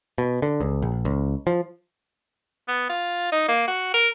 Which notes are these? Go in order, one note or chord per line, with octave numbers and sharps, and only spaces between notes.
B2
D3
C#2
A#1
C#2
F3
B3
F4
D#4
A#3
F#4
A#4